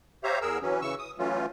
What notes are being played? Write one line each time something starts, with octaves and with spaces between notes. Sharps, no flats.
G4 C5 C#5 E5 F5 A#5
E2 G#4 A#4 E6
E3 F#3 C#4
C#3 E3 C#6 E6
D#6
E3 F#3 A3 C#4 F4